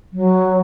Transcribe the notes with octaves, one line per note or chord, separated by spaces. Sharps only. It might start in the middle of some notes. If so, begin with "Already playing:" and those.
F#3